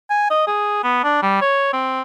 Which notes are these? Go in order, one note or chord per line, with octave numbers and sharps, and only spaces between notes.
G#5
D#5
G#4
B3
D4
G3
C#5
C4